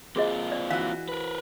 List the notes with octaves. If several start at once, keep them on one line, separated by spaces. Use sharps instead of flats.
A#3 C4 F4 F#4 G#4 D#5
D5
E3 F#4 F5
A#4 B4